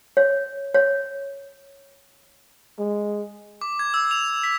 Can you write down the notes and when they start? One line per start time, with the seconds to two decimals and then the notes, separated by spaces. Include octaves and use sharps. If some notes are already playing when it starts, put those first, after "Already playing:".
0.17 C#5
0.74 C#5
2.79 G#3
3.61 D6
3.79 G#6
3.94 E6
4.11 F7
4.44 B6